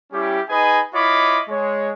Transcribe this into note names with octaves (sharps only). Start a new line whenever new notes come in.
G3 C#4 E4 G4
D#4 G#4 B4 D#5 G#5 B5
E4 F4 C#5 D#5 B5 D6
G#3 C#5